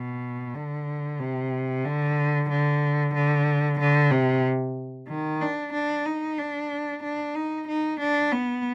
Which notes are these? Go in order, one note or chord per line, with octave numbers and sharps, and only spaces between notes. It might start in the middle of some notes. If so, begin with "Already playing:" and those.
Already playing: B2
D3
C3
D3
D3
D3
D3
C3
D#3
D4
D4
D#4
D4
D4
D#4
D#4
D4
B3